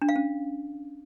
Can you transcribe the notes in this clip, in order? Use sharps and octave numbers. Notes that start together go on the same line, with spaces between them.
D4
F5
C#4